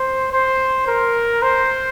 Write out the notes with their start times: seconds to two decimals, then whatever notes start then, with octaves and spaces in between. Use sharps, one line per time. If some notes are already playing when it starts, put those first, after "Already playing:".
Already playing: C5
0.33 C5
0.88 A#4
1.43 C5